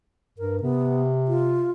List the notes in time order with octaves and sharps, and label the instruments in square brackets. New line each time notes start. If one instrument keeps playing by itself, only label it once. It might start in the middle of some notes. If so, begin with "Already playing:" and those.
[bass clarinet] G2 [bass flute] A#4
[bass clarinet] C3 [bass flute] B3
[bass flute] F4